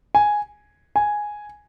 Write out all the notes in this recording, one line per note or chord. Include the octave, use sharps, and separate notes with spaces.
G#5
G#5